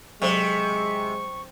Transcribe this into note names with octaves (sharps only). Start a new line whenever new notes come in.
C3 F#3 G#3 A4 C5 C#6